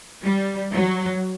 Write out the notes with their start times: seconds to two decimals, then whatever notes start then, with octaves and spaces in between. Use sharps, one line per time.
0.23 G3
0.72 F#3